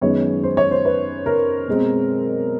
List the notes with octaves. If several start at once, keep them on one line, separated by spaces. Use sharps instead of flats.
F#2 D#3 G#3 B3 C#5
C5
C#5
C5
B4
A#4
B2 G#3 C4